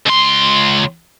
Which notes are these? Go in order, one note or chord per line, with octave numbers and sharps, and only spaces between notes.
C#2 C6